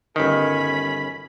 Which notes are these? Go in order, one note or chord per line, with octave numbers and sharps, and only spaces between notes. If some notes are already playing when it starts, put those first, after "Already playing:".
G1 D#3 C#4 B5